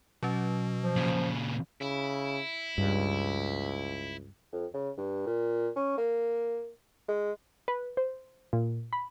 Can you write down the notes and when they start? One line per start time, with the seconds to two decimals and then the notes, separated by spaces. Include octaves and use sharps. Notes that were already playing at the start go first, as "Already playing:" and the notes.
0.23 B2 F#3 C#4
0.82 F3
0.96 A#2 C#3
1.81 C#3 E4
2.78 C#2 G2
4.53 F2
4.74 C#3
4.98 G2
5.27 A#2
5.76 C#4
5.98 A#3
7.09 G#3
7.68 B4
7.97 C5
8.53 A#2
8.93 B5